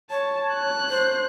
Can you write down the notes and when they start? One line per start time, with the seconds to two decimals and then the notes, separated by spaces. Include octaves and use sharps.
0.10 C#5 A5
0.55 F#6
0.90 C5